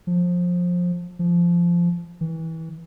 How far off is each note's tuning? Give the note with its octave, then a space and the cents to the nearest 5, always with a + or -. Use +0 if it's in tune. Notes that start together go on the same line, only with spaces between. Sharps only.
F3 +20
F3 -15
E3 -25